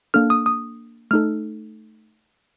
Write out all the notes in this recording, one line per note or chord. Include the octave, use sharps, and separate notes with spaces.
A#3 D4 A4 F6
D#6
D#6
A3 D#4 A4 F6